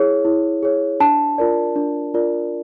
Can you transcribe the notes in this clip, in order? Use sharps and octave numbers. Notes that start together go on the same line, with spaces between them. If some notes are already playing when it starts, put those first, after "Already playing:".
Already playing: E4 G#4 C#5
E4
G#4 C#5
D4 A5
F4 A#4 D5
D4
F4 A#4 D5